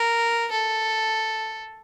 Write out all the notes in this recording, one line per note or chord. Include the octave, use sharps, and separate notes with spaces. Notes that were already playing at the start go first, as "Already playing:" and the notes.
Already playing: A#4
A4